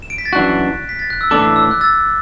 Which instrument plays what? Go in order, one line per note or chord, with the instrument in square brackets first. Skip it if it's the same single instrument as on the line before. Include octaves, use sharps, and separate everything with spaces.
[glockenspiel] E7
D7
B6
A6
[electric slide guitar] F#2 E3 D4 F#4 [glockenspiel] F#6
[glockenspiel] B6
A6
F#6
E6
[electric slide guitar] A2 E3 D4 A4 [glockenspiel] D6
[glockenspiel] E6
F#6
E6 A6